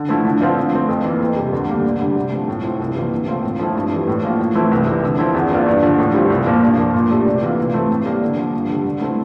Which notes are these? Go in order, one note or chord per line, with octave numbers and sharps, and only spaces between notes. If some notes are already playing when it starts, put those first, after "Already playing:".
Already playing: D3
F3 A3 E4
D3
F3 C4 F4
D3
A3 C4
F2
E3 A#3
F2
C3 G3
D2
D3 G3 A#3
D2
D3 G3
C3
F3 A3
A2
F3 C4 E4
C2
C3 E3 A#3
D3
A3 C4 F4
A2
F3 A3 C4 E4
G2
E3 G3
A2
F3 A#3 F4
A2
E3 A3 C4 E4
C2
C3 E3
D3
F3 C4 E4
E2
E3 A#3 D4 F4
G2
D3 F3
A2
G3 C4 F4
C2
A#2 F3 A#3
G2
F3 A#3
A#2
A3 D4 G4
C3
E3 A#3 F4
C3
E3 A3 C4
A2
G3 A#3 D4
D3
F3 A#3
G2
D3 G3
D3
A3 C4 E4